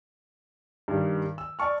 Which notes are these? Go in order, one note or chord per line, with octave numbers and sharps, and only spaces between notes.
G2 D#3 G3
E6
D5 A5 C#6 F6